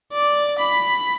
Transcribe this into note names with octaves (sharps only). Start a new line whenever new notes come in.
D5
B5